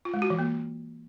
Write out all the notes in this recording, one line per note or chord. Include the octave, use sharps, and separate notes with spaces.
F4
G#3
F#4
E3
A#3